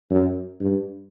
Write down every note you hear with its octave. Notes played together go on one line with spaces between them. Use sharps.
F#2
G2